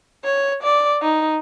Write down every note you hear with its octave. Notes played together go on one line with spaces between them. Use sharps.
C#5
D5
D#4